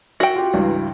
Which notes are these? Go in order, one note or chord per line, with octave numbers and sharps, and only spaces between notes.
F#4 E5 G5
F4 G4
C#2 G2 E3